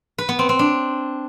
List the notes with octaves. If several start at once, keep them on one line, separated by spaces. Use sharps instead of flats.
B4
B3
C4
C4
D4